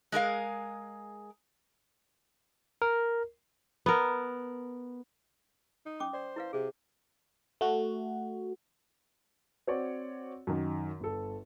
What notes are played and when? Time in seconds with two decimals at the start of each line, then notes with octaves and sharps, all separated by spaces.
0.12 G#3 G#4 A#4 F5
2.82 A#4
3.86 B3 A#4
5.86 D#4
6.00 C#4 D6 D#6
6.13 C5 D5
6.36 E4 B4 F5
6.53 C3 G#4
7.61 A3 F#4
9.67 C4 F#4 C#5 D5
10.47 F#2 D#3
11.00 G1 A4